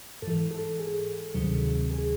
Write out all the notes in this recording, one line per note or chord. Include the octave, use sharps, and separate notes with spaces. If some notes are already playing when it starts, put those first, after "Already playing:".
G#2 E3 A4
A4
G#4
D2 C3 D#3 F#3
G#4